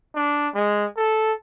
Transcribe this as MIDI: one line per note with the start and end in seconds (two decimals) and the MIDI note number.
0.16 0.49 62
0.55 0.86 56
0.97 1.33 69